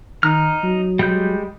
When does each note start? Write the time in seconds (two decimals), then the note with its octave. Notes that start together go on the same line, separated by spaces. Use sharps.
0.23 D#3 D#4 A#5 F6
0.64 F#3
0.99 G3 G#3 G6